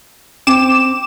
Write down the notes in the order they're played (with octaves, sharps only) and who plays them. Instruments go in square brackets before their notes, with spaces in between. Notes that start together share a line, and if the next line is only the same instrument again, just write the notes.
[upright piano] C4 [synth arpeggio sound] D6 E7